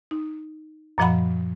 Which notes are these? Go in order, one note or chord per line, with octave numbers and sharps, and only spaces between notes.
D#4
F#2 A#2 F3 D#5 F#5 B5